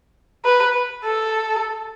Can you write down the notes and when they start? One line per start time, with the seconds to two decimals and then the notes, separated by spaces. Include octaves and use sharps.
0.45 B4
1.05 A4